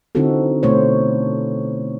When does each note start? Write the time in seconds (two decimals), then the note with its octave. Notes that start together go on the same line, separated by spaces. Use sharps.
0.15 D3 C4 D#4 E4 F#4 A4
0.63 B2 A3 C5 C#5